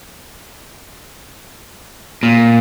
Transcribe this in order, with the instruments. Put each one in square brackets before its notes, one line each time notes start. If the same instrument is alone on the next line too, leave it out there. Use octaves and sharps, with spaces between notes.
[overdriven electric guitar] A#2